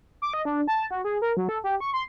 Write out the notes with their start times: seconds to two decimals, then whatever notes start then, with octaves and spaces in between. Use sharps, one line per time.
0.22 D6
0.33 D#5
0.45 D4
0.68 A5
0.91 F#4
1.04 G#4
1.22 A#4
1.37 F#3
1.49 A4
1.64 G4
1.80 C#6
1.94 C6